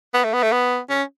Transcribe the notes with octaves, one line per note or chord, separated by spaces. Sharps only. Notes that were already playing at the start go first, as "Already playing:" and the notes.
B3
A3
B3
A3
B3
C#4